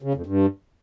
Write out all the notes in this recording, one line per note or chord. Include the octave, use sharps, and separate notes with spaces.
C#3
F2
G2